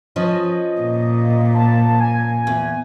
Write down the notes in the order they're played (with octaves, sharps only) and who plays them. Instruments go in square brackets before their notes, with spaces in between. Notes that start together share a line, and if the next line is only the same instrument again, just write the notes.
[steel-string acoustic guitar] F3 C#4 B4 [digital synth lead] D#5
[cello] A#2
[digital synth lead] A5
G#5
[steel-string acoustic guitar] E2